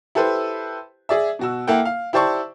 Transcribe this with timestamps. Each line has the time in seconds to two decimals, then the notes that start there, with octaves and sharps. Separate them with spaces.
0.15 E4 G4 A4 B4 C5
1.09 G#4 D5 E5
1.39 B2 F#4 E6
1.67 A#3 E4 A4 E5 F#5 G5
1.85 F5
2.13 E4 G4 C5 D5 A5 C#6